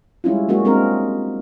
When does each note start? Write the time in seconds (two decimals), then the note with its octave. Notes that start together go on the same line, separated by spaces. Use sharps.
0.24 G3 G#3 C#4 E4 F4
0.48 F#3 G#3 A#3 C#4 F#4
0.65 G#3 A#3 C4 D4 A#4